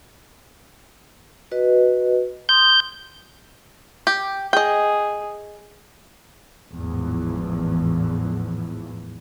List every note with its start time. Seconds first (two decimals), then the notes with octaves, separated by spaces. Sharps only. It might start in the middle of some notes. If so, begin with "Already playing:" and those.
1.52 F#4 B4 D#5
2.49 C6 D#6 G6
4.07 G4
4.53 G#4 D#5 G5
6.74 G#1 E2 A2 E3 F3